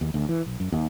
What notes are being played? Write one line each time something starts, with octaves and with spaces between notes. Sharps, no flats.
D#2
D2
E3
B1
F#2
D#2